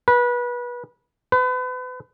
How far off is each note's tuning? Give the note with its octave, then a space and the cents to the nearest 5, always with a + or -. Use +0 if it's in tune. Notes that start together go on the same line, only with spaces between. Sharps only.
B4 -25
B4 +35